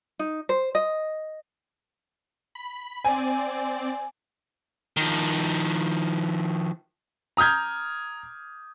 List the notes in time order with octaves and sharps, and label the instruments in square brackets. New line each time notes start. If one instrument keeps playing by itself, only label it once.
[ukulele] D#4
C5
D#5
[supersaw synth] B5
[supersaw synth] C4 D5 [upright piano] G#5
[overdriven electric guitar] D#3 F3
[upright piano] A#5 D#6 F6 G6 G#6